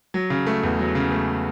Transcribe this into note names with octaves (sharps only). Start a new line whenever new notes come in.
F#3
C#3
A3
E2
F#3
C#3
A3